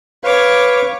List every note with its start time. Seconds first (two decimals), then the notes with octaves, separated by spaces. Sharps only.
0.24 B4 C#5 F5 D6